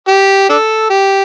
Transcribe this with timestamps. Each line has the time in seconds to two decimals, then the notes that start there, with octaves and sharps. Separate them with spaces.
0.08 G4
0.49 D4 A4
0.90 G4